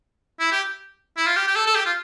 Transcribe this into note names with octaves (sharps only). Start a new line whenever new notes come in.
E4
G4
E4
F4
G4
G4
A4
A4
G4
F4